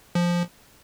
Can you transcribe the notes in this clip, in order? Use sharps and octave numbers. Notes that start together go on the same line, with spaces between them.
F3